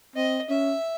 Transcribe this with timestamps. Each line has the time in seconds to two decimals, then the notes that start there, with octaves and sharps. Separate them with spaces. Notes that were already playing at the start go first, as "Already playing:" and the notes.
0.16 C4 D#5
0.50 C#4 E5